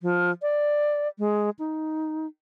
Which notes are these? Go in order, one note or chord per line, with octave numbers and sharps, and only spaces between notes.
F3
D5
G#3
D#4